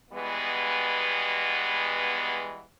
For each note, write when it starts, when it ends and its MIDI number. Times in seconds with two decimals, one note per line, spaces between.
0.11 2.61 47
0.11 2.61 52
0.11 2.61 55
0.11 2.61 56
0.11 2.61 59